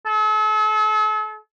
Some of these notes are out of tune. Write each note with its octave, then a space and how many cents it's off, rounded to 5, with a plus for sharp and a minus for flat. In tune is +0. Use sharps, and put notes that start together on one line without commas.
A4 -40